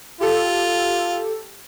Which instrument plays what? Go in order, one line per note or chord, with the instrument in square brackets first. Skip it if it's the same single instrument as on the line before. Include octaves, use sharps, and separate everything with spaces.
[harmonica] F4 [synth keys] G4 A4